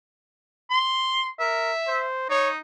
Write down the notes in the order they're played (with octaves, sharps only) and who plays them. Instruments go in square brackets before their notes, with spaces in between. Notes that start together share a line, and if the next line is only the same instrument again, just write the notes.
[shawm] C6
[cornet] A#4 [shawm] E5
[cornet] C5
[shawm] D#4 [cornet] C#5